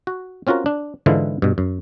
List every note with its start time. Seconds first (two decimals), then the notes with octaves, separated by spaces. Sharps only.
0.07 F#4
0.47 C4 C#4 F4 F#4 A#4
0.66 D4
1.06 G#2 D3 E3 G#3 E4 F4
1.42 G2 B2
1.58 F#2